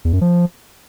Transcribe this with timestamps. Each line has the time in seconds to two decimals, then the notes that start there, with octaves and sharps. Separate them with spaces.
0.05 E2
0.13 F#2
0.21 F3